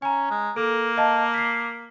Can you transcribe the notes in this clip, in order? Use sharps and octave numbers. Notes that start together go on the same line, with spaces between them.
C#4 G#5 A#5
G#3
A#3 A4
D#5 F5 A5
B6 C7